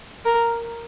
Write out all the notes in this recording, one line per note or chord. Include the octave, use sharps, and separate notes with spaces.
A#4